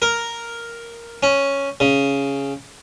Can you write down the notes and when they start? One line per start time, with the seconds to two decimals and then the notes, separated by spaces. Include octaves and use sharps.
0.02 A#4
1.23 C#4
1.80 C#3